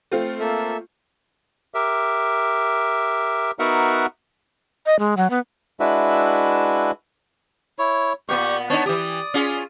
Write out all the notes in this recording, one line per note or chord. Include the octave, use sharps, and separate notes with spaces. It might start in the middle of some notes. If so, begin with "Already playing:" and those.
A3 C4 F4
A#3 A4 E5
G4 A#4 E5
B3 D#4 F#4 A#4 E5 F#5
D#5
G#3
F#3
B3
G#3 D4 E4 F#4 B4 E5
E4 C#5
A#2 B3 G4 C#6
B3 D4 D#4 C#5 A5
E3 G4 D5 D#6
C#4 F4 G#4